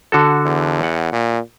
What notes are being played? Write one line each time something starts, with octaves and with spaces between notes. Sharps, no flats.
D3 F#4 A4
E2
F#5
A#2